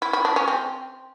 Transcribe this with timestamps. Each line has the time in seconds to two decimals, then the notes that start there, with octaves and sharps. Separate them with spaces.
0.02 E4
0.13 E4
0.25 D4
0.36 C#4
0.48 C4